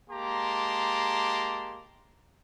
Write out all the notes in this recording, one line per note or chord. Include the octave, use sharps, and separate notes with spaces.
G#3 A#3 G4 A5 A#5 C6